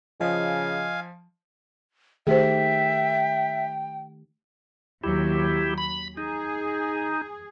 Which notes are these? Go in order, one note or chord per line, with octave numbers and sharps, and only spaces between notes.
C#3 F3 D#5 F5 G#5
D#3 A3 G4 G#4 C5 E5 G5
D#2 F#3 E4 G4
B5
D#4 G#4